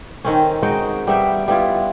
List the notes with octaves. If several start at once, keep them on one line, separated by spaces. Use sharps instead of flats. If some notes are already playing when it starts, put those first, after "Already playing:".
D#3 C4 C#4
G#3 D#4 F#4 G5
G3 B3 E5 G5
G3 B3 E4 F4